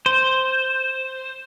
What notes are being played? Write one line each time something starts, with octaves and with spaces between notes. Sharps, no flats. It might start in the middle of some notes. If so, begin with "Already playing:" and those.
C5